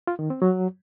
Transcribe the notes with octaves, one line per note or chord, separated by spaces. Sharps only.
F4
D#3
C4
F#3